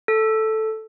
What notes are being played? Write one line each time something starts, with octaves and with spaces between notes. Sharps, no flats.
A4